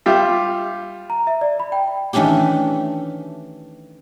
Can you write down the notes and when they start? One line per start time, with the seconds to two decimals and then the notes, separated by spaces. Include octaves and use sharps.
0.06 G3 F4 G4 E5
1.10 A#5
1.27 E5
1.41 D5
1.60 B5
1.72 G5
2.13 D#3 E3 A3 C#4 D4 G4